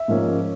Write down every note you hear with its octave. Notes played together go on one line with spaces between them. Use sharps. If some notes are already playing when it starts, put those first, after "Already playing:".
Already playing: E5
G#2 F3 A#3 C#4